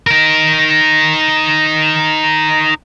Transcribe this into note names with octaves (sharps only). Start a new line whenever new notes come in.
D#4 A#4